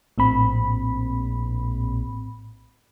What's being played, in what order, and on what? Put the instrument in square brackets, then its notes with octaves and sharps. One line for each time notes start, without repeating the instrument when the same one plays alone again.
[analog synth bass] A#1 [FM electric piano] A2 C4 B5